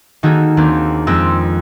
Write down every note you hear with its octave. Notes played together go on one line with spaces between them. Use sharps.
D#3 A#3 D#4 F#4 G#4 A4
D#2 A#3 C4 D4
F2 G#3 C4 E6 A#6